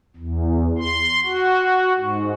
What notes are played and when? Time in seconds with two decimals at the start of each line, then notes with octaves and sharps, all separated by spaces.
0.16 E2
0.79 C6
1.24 F#4
1.98 G#2